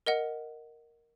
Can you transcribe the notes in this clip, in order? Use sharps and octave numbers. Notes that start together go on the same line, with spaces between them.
A#4 D#5 F#5